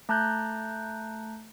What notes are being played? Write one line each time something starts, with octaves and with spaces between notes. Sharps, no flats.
A3 A5 A#5 F#6 G6